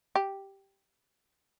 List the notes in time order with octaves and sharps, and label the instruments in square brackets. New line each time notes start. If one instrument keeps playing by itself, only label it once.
[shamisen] G4